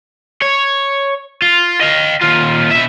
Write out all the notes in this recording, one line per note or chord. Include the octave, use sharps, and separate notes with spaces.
C#5
F4
D#5 F5
D#2 F4
B2 E5